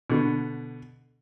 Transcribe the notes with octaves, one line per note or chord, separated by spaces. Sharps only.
B2 D3